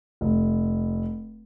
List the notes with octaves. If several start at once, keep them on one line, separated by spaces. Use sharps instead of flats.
F1